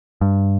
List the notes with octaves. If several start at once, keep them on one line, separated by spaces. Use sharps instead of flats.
G2